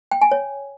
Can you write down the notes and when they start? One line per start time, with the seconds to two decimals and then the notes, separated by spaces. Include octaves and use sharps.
0.11 G5
0.21 G#5
0.31 C#5